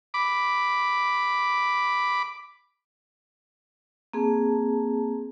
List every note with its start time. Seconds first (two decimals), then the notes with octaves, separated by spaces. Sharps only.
0.14 B5 D6
4.14 A#3 C4 G#4 A5